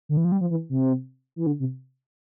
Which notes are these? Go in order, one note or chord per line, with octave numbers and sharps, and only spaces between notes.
D3
E3
F3
G3
F3
E3
C3
E3
D3
C3